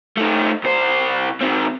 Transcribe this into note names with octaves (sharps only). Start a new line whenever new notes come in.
A3 D#4
C2 C5
D#3 C4